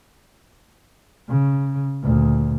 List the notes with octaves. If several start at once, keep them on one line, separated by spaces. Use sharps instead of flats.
C#3
D2 A#2